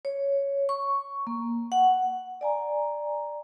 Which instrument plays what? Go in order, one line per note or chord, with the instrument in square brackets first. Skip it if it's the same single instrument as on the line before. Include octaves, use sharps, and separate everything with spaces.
[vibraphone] C#5
C#6
A#3
F#5
D5 G#5 A#5